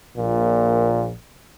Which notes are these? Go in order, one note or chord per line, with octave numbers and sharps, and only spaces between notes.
A#1 A#2